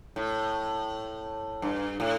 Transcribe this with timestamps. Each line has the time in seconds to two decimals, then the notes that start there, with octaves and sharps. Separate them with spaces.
0.16 A2
1.62 G2
2.00 A2